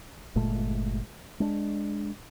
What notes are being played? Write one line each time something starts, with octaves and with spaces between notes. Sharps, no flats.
G1 A#2 G#3 A3
G#3 D4